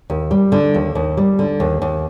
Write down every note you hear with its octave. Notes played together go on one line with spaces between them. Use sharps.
D#2
G3
D3
D#2
D#2
G3
D3
D#2
D#2